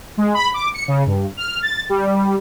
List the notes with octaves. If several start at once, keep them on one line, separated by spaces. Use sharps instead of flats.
G#3
B5
D6
C#7
C#3
G2
F6
A6
G3